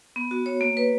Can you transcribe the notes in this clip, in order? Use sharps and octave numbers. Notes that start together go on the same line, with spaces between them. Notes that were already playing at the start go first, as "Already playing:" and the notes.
B3
F#4
C#5
A#3
B4